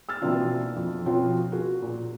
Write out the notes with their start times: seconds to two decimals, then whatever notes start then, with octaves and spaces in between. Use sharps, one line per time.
0.09 E6 F6 A6
0.22 B2 E3 A#3 C4 D4 F4
0.76 F2
1.06 B2 F3 C4 C#4 F4 F#4
1.52 F#4 G#4
1.82 A#2